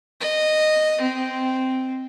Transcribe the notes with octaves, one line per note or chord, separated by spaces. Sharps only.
D#5
C4